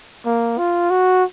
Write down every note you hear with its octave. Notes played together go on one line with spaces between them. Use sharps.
A#3
F4
F#4